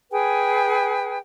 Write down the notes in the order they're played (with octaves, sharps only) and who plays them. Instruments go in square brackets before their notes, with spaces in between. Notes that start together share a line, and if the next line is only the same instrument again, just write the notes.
[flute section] G#4 B4 G5 G#5